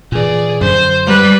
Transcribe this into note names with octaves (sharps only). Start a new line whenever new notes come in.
A#2 E3 G#4 D5
F#2 D3 C5
G3 B4